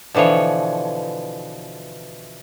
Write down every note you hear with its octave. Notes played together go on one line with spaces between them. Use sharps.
B2 D3 E3 F3 C#5